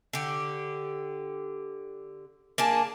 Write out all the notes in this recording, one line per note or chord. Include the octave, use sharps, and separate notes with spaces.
D3 G4
A#3 D4 G#4 A5